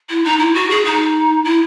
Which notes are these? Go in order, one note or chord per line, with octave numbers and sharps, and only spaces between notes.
E4
D#4
E4
F#4
G#4
D#4
E4